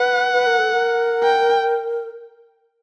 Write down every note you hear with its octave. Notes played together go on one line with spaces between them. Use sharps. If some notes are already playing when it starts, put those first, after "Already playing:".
Already playing: B4 F#5
B4
A#4
A4
A#4
G5